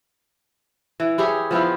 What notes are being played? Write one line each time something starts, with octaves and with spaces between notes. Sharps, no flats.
E3
E4 G4 G#4 C#5
F3 B3 E4 F4